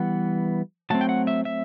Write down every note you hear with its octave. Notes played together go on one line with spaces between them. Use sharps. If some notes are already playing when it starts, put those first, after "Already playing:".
Already playing: E3 G3 B3 F#5
F#3 A3 C4 A5
G5
F#5
E5
E5